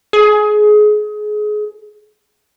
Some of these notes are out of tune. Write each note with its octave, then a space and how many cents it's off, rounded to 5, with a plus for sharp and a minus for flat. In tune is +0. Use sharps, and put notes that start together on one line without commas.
G#4 +25